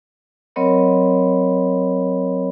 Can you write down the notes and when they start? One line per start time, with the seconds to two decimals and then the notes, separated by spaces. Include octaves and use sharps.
0.56 F#3 C4 A#4 C#5 D#5 B5